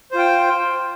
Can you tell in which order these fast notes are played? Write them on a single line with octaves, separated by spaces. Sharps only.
C5 F4 G5